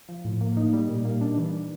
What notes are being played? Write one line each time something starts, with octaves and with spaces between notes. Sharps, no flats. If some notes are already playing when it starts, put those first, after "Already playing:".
F3
A2
A#3
D#4
G3
A#2
A#3
D4
E3